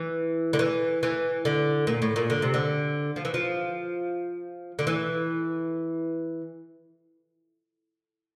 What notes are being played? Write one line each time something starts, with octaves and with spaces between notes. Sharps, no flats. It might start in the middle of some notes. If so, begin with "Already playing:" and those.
Already playing: E3
D3
E3
E3
D3
A#2
A2
A#2
D3
C3
D3
F3
E3
F3
D3
E3